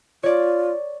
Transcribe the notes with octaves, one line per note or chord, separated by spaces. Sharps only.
F4 C#5 D5